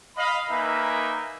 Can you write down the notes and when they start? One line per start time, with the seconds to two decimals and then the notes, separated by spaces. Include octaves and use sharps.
0.17 D#5 F5 B5
0.49 A#3 D#4 A#4 B4 E5 G#5